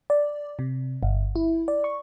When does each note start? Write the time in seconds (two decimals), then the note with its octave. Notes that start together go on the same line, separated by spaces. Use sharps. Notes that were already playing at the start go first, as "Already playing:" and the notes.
0.10 D5
0.59 C3
1.03 G1
1.36 E4
1.68 D5
1.84 C#6